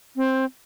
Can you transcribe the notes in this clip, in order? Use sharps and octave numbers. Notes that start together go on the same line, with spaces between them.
C4